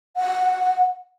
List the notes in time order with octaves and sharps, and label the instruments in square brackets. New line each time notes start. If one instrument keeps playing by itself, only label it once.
[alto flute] F#5